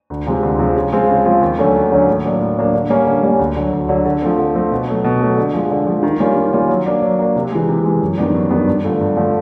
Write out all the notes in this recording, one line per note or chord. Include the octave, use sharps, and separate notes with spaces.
D2
C3 F3 G#3 C4
D2
C3 F3 G#3 C4
C#3
F3 G#3 C4 F4
C#3
F3 G#3 C4 F4
D#2
D3 F#3 A3 C#4
D#2
D3 F#3 A3 C#4
A2
F#3 A#3 D4
A2
F#3 A#3 D4
D3
G3 A#3 C#4
D3
G3 A#3 C#4
D2
D3 F#3
D2
D3 F#3
D3
F3 A3 C4
D3
F3 A3 C4
B2
F#3 A3
B2
F#3 A3
D3
F3 G#3
D3
F3 G#3
D#3
G3 A#3 C#4 F4
D#3
G3 A#3 C#4 F4
F#3
A#3 D4
F#3
A#3 D4
C3
E3 G#3
C3
E3 G#3
F#2
D#3 G3 B3 D4
F#2
D#3 G3 B3 D4
G2
D3 F3 A3
G2
D3 F3 A3